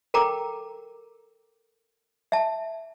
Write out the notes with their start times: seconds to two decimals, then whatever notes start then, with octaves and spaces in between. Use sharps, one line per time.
0.14 A4 A#4 G5 A#5 D6
2.32 E5 A5